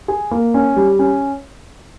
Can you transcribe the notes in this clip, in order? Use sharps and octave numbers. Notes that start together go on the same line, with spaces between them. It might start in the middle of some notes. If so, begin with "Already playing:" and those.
G#4
A#3
C#4
G3
C#4